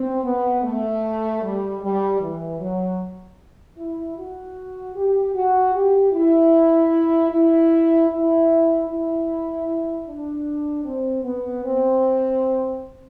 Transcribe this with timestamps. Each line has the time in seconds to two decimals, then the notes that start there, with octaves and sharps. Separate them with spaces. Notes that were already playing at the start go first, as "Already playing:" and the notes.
Already playing: C4
0.23 B3
0.63 A3
1.42 G3
1.81 G3
2.20 E3
2.59 F#3
3.77 E4
4.17 F#4
4.96 G4
5.35 F#4
5.74 G4
6.13 E4
7.30 E4
8.10 E4
8.88 E4
10.07 D4
10.85 C4
11.23 B3
11.63 C4